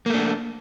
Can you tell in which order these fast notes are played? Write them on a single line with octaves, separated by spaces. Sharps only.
A#3 A3 D4